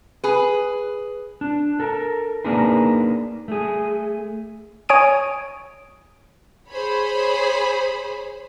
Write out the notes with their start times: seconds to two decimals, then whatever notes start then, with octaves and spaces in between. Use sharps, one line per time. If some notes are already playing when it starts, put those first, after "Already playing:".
0.24 G#4 B4
1.41 D4
1.80 A4 A#4
2.44 A#3 D4 D#4 G#4 A#4 B4
3.48 A3 G#4
4.89 C#5 G#5 D#6 D7 D#7
6.70 G#4 C5 C#5 B5